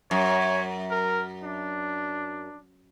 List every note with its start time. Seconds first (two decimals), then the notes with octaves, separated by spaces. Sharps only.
0.11 F#2 C#5
0.91 A#4
1.43 D4